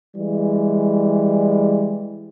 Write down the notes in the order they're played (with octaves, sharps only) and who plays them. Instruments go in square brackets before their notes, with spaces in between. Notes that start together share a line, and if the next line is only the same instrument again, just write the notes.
[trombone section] E3 G3 G#3